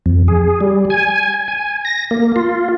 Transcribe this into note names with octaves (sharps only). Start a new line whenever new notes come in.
F2
G#4
G3
G#5
G#5
A#6
A#3
F4